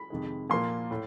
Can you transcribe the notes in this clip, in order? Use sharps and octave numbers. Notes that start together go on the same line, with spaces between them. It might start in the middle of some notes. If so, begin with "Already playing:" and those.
Already playing: B5
F2 C3 D#3 G#3
A#2 F3 A#3 C6
A2